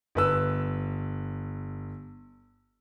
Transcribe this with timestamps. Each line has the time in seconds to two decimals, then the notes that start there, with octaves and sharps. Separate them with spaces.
0.15 G1 B4 E6